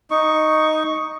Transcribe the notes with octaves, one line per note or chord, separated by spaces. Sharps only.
D#4 C#6